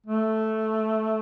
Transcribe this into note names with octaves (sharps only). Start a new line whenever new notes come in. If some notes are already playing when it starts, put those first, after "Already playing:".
A3